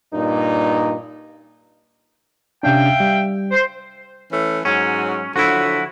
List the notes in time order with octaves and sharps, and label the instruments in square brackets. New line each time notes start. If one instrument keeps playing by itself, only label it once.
[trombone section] G2 A#2 D#4
[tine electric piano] C3 C#4 D4 [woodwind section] E5 F5 G5
[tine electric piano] G3
[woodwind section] C5
[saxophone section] E3 A3 C#4
[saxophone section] G#2 F#3 [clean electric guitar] C#4
[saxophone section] D3 F3 F#3 [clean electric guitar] E4 F#4